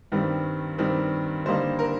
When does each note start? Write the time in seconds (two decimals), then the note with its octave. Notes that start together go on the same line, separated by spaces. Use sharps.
0.12 G2 D#3 G3 C4
0.78 G2 D#3 G3 C4
1.46 D3 G3 A#3 D#4 C5
1.79 A#4